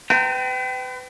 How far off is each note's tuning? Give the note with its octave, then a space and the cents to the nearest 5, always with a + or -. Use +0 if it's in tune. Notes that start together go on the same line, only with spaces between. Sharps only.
B4 +40 G5 -20 A#5 -45